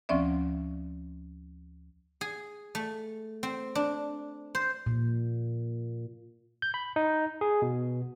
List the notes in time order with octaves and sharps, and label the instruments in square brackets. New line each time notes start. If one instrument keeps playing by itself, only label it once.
[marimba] D2 F3 C4 C#4 D5 E5
[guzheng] G#4
A3
C4
D4
C5
[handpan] A#2
[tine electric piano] G6
B5
D#4
G#4
B2